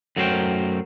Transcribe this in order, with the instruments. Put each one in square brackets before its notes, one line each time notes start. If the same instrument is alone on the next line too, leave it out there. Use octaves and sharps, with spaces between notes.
[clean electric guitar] F#2 F#3 A3 A#4 C5 G5